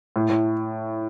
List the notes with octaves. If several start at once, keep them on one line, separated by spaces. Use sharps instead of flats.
A2
A2